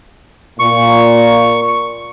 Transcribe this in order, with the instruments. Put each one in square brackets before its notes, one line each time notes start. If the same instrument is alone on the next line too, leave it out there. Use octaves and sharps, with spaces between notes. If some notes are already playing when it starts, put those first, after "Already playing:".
[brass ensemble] A#2 [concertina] C#6